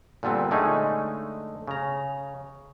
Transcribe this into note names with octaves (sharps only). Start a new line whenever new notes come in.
A#2 D3 G3 B3 C4
D3 G#3 A3 C#4 D#4 G#4
C#3 A#5